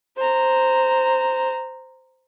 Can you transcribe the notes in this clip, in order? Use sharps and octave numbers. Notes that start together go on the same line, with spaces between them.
C5 A#5